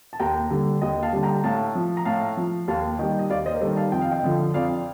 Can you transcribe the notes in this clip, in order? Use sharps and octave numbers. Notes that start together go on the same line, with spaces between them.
A5
D#2 G5 A#5
D3 G3
D#2 D#5 G5
F5 A5
D3 G3
G5 A#5
A2 F5 A5
F3
A#5
A2 F5 A5
F3
D#2 F5 A5
D#3 G3 D#5 G5
D#5
D#2 D5 F5
C5 D#5
A#4
D#3 G3 A4 C5
F5 A5
F2 G5
F5
D#5 G5
D3 F3
F2 D5 F5